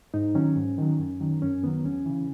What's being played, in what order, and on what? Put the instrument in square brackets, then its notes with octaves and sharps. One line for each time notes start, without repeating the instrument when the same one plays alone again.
[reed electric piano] G#2 D#4
D#3 F#3 C#4
G#2
D#3 F#3
F#2
D#3 F#3
F#2 C#4
D#3 F#3 B3
E2 C#4
C#3 E3